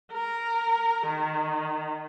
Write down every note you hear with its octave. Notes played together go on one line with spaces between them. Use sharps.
A#4
D#3